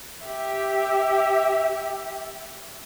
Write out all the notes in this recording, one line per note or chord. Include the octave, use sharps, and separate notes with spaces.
G4 E5